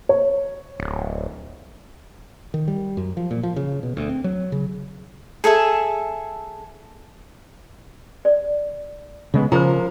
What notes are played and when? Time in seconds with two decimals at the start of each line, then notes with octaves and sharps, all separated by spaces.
0.09 C#5
0.80 D1
2.54 D#3
2.68 G3
2.97 F#2
3.17 F3
3.31 A#2
3.43 F3
3.56 C#3
3.83 B2
3.97 D2
4.09 C4
4.24 F#3
4.52 C#3
5.44 G#4 A4 E5 G#5
8.25 D5
9.34 C#3 G#3 B3
9.52 C#3 F3 A#4 C5 A#5